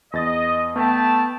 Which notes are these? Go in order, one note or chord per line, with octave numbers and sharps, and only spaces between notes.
E2 D#5 A6
A3 B3 E5 G5 A5